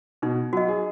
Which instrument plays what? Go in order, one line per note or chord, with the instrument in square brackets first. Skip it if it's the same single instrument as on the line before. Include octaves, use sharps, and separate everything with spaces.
[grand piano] B2 [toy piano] D#4
[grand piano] F#3 [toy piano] F#4 D#5
[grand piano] G#4